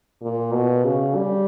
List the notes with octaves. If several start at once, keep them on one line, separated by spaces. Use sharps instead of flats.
A#2
B2
C#3
G3